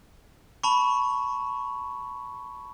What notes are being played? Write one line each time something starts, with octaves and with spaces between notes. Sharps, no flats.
A5 B5 C#6